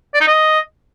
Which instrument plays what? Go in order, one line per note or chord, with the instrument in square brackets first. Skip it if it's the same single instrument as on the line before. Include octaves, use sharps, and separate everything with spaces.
[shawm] D5
D#4
D#5